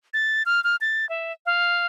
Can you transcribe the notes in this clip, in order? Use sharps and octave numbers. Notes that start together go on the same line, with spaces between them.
A6
F6
F6
A6
E5
F5